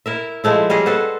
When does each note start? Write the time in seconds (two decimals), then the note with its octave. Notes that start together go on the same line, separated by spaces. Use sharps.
0.06 E4 A#4 E5
0.44 F3 G#3 A3 E4
0.70 G3 C#4 G#4 D#5
0.86 A4 B4 C5 F#5